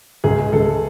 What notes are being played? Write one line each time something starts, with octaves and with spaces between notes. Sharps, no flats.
C#2 G#4
G#3
C#2 A4
G#3